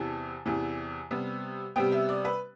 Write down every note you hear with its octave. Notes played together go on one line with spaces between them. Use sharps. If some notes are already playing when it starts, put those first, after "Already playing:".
Already playing: E2 C3 E3 A5
E2 C3 E3
C3 G3 B3
C3 G3 B3 G5
E5
D5
B4